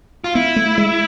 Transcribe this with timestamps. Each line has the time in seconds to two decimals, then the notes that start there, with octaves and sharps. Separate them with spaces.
0.24 F4
0.35 B3 E4
0.56 A3
0.78 G#3